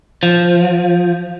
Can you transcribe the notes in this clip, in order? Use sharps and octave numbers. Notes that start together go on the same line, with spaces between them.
F3